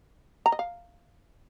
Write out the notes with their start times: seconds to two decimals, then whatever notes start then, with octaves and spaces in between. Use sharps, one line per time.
0.46 A#5
0.52 D#5
0.59 F5